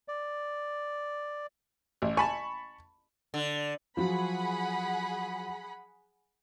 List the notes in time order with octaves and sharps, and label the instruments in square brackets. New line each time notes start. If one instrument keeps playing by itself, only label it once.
[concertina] D5
[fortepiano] A1
[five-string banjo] G#5 [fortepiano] A5 B5 C#6
[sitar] D3
[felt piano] F3 F#3 F#4 [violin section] G#4 F#5 B5